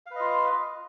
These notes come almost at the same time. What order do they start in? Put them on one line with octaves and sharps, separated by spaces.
F5 B4 D#5 F4